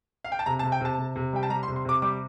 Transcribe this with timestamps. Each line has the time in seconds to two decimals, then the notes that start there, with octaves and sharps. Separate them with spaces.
0.24 F5
0.32 G5
0.39 A5
0.46 C3 A#5
0.59 A5
0.63 C3
0.72 G5
0.81 C3 A5
0.98 C3
1.16 C3
1.33 G3 G5
1.43 A5
1.50 G3 A#5
1.63 C6
1.68 C3
1.76 C6
1.85 C3 D6
2.02 G3 D6